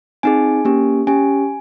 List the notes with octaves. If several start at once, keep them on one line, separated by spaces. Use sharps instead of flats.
C4 D#4 G#4 G#5
A#3 C#4 G4
C#4 G4 G#5